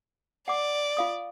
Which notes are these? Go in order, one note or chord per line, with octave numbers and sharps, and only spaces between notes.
D5 F#5 D6
F4 F5 D#6